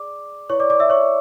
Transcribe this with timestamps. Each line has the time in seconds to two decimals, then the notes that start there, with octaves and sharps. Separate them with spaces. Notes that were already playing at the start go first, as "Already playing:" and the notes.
Already playing: G#4 D5 D6
0.50 E4 B4 C#5 D5 C#6
0.60 D5 D6
0.70 D5 D6
0.80 E5 E6
0.90 C#5 C#6